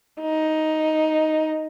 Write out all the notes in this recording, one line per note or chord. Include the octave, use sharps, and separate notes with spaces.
D#4